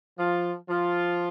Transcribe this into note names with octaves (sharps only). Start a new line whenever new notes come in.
F3 F4
F3 F4